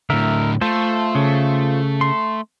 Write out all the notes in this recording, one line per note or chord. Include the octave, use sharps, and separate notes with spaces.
A2 D3 A#4 E5
A3 F4 A4 C5
C#3
C6